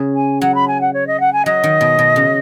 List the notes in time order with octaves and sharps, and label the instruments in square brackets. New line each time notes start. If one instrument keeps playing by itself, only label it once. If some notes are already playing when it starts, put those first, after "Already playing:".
Already playing: [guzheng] C#3
[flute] G#5
[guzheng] F#3 [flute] F#5
[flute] B5
G#5
F#5
C#5
D#5
F#5
G#5
[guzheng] F#3 [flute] D#5
[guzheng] D#3
B2
B2
C#3